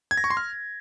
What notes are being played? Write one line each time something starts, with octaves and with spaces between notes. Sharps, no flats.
G#6
A#6
C#6
C6
F6